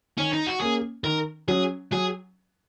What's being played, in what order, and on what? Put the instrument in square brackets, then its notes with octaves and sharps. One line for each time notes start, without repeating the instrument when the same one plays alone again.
[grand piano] D#3 [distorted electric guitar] C#4
[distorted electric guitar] D#4
F#4
[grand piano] A#3 C#4 [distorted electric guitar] G#4
[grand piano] D#3 [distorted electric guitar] A#4
[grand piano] F#3 C#4 [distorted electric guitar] G#4
[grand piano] F#3 [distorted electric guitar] G#4